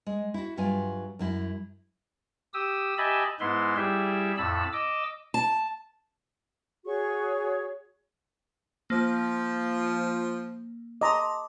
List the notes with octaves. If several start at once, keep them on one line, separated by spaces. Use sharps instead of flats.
G#3
E4 F#4
G2 F#3 F4 E5 G#5
F#2 F#3 E4
G4 D#6 E6
G4 D#5 E5 G#5 A5 B5
G#2 G#3 B3 E4 B4 C6
G3 E4 G4 G#4 E5
F2 A2 A5 B5 E6
D#5 D6 E6
A5
F#4 G#4 C#5 C#6
F3 A#3
D#5 A5 A#5 C6 D6